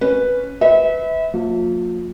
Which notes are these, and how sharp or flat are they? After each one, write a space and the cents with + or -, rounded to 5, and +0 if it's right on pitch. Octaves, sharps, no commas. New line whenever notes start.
C#4 +0 B4 +0
B4 +20 E5 -30
F3 +30 A#3 -30